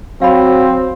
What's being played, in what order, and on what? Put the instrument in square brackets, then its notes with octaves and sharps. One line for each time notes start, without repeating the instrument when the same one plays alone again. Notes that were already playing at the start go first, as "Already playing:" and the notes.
[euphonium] F#3 [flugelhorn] C4 [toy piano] F5 B5